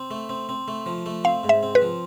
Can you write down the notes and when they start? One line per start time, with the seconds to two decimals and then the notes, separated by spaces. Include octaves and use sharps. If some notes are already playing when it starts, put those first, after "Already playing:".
Already playing: C4
0.11 A3
0.29 C4
0.49 C4
0.68 A3
0.86 F3
1.06 A3
1.24 C4 F5
1.43 G#2
1.49 E5
1.63 C4
1.75 B4
1.82 F3